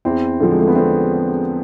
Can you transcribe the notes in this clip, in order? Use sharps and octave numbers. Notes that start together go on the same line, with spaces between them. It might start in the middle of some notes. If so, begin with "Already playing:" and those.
E2 C4 E4
D3 F3
G#3
A3
B3
D3 A3 C4